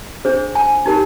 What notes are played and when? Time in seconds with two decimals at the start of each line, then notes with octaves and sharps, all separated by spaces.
0.25 D4 G#4 C5
0.55 G#5
0.86 D#4 G4 A#4